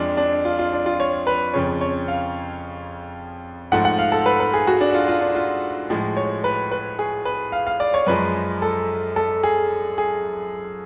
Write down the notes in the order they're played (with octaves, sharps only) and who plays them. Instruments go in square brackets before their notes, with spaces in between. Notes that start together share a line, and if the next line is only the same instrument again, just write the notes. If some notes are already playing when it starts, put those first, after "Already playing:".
Already playing: [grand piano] F2 F3 G#3 D4
D4
F4
F4
D4
F4
C#5
B4
F2 C#3 F3 C#5
C#5
F5
G#2 F3 A3 F#5
F#5
F5
A4
B4
B4
G#4
F#4
D4
F4
F4
D4
F4
A2 F3 G#3
C#5
B4
B4
G#4
B4
F5
F5
D5
C#5
F#2 F3 G#3 B4
A4
A4
G#4
G#4